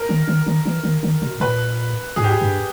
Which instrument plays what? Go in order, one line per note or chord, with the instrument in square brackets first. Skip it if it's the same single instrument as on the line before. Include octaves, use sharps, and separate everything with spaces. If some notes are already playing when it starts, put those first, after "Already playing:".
Already playing: [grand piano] A#4
[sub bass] D#3
D#3
D#3
E3
D#3
D#3
B2
[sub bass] A#2 [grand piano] B4
[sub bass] G#2 [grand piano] G#4
[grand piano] G4
G#4
[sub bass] G2